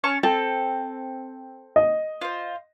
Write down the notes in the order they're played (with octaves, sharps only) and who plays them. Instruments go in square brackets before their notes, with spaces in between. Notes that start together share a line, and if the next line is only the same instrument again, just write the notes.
[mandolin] C#4 A5 C#6
[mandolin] C4 [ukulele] A4
[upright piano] D#5
[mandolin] F4 C5